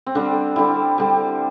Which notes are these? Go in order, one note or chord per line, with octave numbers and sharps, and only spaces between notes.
C4
D3 G3 D4
D3 G3 E4
D3 G3